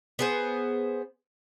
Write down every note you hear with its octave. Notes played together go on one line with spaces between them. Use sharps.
B3 G#4 C5